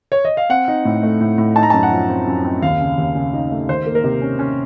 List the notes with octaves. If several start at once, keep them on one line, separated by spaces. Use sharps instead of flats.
C#5
D#5
F5
C4 F#5
D#4
A2
A3
A2
A2
D#4 A5
A#5
A5
F#2
F#5
F3
C4
F#2
C4
D#2 F5
C#3
D#2
C#3
D#4
A3
D#3 C5
A#3
A#4
C3
C#4
C#4